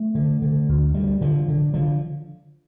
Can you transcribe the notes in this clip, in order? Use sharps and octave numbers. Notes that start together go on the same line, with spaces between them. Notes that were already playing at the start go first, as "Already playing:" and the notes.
Already playing: A3
D3
D3
D2
D2 G3
D3 F3
D3
D3 F3